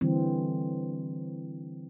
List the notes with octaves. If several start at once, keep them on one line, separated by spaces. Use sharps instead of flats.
D3 E3 G3 C4